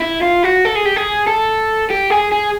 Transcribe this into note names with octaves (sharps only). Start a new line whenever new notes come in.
E4
F4
F#4
A4
G#4
G4
G#4
A4
G4
G#4
G#4